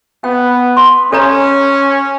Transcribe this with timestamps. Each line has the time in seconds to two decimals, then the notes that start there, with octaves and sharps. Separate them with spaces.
0.24 B3 G5
0.77 C6
1.12 C#4 A4 C#5 A#5